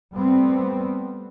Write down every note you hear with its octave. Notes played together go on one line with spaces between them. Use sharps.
G3 A3 B3 C4